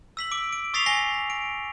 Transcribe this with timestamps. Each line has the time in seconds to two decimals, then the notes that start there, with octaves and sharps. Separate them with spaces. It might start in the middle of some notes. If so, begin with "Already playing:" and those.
0.17 E6 B6 F#7
0.31 D6 D7
0.53 D7
0.74 C#6 D#6 A6 B6 C7 F7
0.86 G#5 A#6 C7 G7
1.30 D7